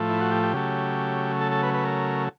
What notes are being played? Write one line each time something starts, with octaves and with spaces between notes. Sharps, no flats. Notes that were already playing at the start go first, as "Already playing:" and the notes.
Already playing: A2 F3 A3
E4
F#4
G4
G4
C#3 F#3 A3
A4
A4
B4
B4
A#4